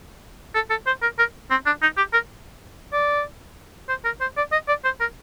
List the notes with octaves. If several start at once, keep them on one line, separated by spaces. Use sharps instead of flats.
A4
A4
C5
A#4
A#4
C4
D4
D#4
G4
A#4
D5
C5
A#4
C5
D5
D#5
D5
C5
A#4